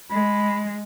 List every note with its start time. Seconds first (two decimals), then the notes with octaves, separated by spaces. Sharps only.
0.10 G#3 B5